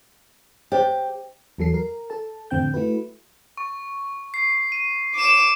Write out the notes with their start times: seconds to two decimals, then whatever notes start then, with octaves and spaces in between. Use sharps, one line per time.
0.72 G4 C5 C#5 D#5
1.58 E2 F#3 A4 C7
1.74 A#4
2.10 A4 A5
2.51 F2 A2 D3 C4 G5 G6
2.74 A3 E4 F#4 B4
3.57 C#6
4.34 C7
4.72 D#7
5.15 D6 E7